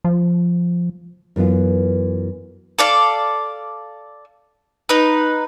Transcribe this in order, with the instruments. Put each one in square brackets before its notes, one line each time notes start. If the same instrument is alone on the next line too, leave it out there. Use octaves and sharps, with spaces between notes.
[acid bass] F3
[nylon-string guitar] F#2 E3 B3 F4
[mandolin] A4 D5 F5
D#4 B4